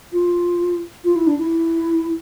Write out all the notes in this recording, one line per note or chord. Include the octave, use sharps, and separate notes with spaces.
F4
F4
E4
D4
E4